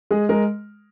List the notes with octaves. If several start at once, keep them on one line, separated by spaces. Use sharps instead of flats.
G#3 G#4
G#3 A#4